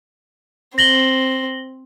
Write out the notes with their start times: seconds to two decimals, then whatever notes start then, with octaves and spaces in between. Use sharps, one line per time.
0.78 C4 A#6 F#7 G7